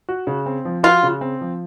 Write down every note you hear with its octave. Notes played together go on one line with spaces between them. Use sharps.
F#4
C#3
C4
F3
F4 F#4
C#3
C4
F3